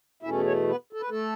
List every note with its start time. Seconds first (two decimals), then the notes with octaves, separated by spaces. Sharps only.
0.23 E2 B2 A3 C#4 E4 E5
0.46 C#4 C#5
0.69 B3 B4
0.93 A4
1.01 B4
1.10 A3 A4